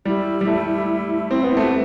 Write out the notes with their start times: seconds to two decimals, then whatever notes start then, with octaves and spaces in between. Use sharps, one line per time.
0.05 G3 E4
0.41 G3
0.47 A3
1.31 C4
1.43 B3
1.57 A3
1.64 G4